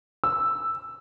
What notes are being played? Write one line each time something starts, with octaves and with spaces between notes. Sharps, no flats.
E6